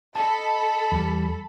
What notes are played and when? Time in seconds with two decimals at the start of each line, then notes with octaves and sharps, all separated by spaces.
0.15 A4 D#5 A5 B5
0.92 E2 G3